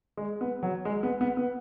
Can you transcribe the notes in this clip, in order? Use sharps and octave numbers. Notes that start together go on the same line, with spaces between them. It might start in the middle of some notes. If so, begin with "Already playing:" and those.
G#3
B3
F#3
G#3
B3
B3
B3